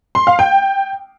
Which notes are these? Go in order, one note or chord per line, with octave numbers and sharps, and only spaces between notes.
C6
F5
G5